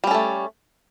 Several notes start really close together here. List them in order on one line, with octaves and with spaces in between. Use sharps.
G3 C#4 A4 A3